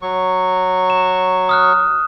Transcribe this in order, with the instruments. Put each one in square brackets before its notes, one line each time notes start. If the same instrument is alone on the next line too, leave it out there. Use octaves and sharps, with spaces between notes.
[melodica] F#3 C#6
[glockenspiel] E7
D#6 F6 F#6